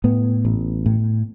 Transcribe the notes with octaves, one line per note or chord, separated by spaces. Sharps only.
A2 B3
A1
A2